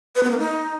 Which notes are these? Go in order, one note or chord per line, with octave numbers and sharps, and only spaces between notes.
B4
B3
A#3
D#4